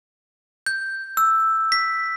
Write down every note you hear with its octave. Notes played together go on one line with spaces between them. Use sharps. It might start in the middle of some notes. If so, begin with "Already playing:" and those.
G6
E6
B6